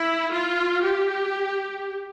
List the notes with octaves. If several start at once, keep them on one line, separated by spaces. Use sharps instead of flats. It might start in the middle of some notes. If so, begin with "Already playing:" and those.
Already playing: E4
F4
G4